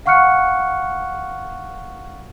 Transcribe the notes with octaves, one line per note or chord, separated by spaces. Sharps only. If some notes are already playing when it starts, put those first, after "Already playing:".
F5 F#5 C#6 F6 F#6 C#7